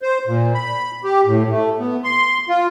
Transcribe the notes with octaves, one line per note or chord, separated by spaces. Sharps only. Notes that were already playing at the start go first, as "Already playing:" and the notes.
C5
A#2
B5
G4
A2
A3
B3
C6
F4